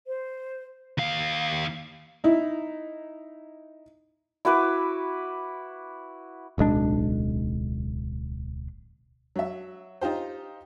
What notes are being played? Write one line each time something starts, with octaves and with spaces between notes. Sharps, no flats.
C5
D#2 F5
D#4 E4
E4 F#4 B4 D6
D1 B1 G#3 D4
F#3 E5
D#4 F4 G4 C5